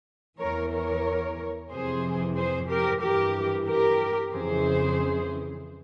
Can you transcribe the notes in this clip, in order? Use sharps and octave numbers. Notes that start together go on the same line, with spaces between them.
E2 E3 A#4 C#5
A#4 C#5
F2 C3 E3 G#4 C5
G#4 C5
G4 A#4
G2 E3 G4 A#4
G4 A#4
F2 C#3 E3 G#4 C5